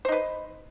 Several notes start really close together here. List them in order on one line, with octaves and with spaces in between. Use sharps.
C5 D#4 B4